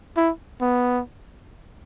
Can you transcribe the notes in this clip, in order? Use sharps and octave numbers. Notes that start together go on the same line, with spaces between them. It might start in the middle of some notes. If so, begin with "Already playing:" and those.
E4
B3